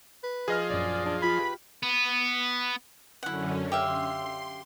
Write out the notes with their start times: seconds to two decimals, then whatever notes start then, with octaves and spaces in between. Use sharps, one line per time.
0.23 B4
0.48 F3 G#4 D#5 F6
0.70 A#1 F#2 D5
1.06 D4
1.22 F4 B5 G#6
1.39 G4 B4
1.83 B3
3.23 F#2 D3 C#4 E4 F#5
3.72 G4 E5 F5 C6